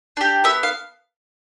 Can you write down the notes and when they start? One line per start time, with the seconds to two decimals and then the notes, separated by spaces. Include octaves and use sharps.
0.17 D4 G4
0.44 B3 E5
0.63 F5